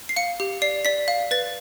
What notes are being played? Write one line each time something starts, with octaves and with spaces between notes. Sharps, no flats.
C7
F5 C#7
G4
D5 C7
D5 B6
F5
B4 A6